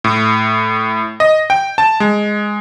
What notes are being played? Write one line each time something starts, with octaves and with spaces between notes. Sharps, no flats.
A2
D#5
G5
A5
G#3